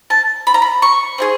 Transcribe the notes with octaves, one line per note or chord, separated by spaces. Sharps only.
A5
B5
A#5
B5
C#6
C4 E4 G#4